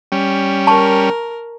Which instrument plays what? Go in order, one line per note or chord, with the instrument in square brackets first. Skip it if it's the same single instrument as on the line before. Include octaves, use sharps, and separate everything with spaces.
[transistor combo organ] G3 C#4
[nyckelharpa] A#4 [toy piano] A5 C#6